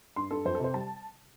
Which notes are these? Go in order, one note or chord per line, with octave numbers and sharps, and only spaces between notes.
G2 C6
G2 A4
F2 C5
A4
C3 C5
G3 A5